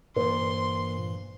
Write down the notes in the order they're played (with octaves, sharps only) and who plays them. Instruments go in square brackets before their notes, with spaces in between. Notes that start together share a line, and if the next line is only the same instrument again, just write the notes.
[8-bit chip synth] G2 E3 [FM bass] A#2 [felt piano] C5 [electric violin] C6